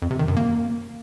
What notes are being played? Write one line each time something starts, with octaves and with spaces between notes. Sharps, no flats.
F2
C3
D#3
F#2
A#3